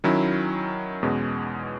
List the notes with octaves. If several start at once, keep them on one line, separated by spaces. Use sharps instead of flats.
D#3 F#3 C#4 E4
E2 B2 G#3 C#4